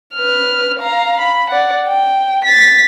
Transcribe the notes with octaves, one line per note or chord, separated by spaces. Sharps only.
B4 F6
F5 A#5
B5
D5 F#5
G5
A6 B6